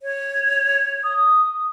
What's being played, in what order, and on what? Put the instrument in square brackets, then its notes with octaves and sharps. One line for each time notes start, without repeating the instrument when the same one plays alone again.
[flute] C#5
[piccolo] D#6